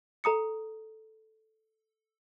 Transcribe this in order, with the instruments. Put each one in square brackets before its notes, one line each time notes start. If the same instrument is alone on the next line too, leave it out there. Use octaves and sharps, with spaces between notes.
[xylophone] A4 A#5 D#6 C#7